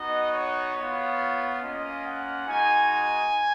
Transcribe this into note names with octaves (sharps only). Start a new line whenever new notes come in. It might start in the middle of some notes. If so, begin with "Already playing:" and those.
Already playing: B3 D#4 F#4 D#5
C#5
B3 F4
A#3 C#4 F4 D#5
F#5
G#3 D#4 F#4 G#5